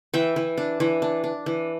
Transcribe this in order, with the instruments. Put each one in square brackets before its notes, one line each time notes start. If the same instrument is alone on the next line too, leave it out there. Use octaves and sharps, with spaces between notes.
[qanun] E3 E5 G5
E3
D4
E3
D4
D4
E3